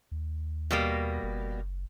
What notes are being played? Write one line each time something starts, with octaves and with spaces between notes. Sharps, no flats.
D#2
B2 G3 A#3
F#1